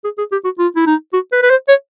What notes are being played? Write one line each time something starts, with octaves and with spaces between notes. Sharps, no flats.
G#4
G#4
G4
F#4
F4
E4
D#4
F#4
B4
B4
C5
C#5